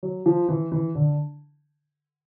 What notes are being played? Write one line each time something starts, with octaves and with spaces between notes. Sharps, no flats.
F#3
F3
E3
E3
D3